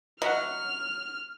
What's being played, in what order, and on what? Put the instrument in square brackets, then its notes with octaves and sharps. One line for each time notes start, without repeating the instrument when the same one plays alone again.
[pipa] F#3 [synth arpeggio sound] D#5 E5 F#5 [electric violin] F6